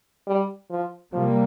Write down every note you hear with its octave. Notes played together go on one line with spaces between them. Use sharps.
G3
F3
C3 F3 G3 A#3